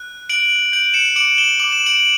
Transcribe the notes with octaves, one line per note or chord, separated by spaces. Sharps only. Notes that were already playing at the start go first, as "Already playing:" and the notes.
Already playing: F#6
F#6 D7 F#7
G6 D7 F#7
C#7 E7
D6 D7 F#7
E7 G7
D6 F#7
E7
D7 F#7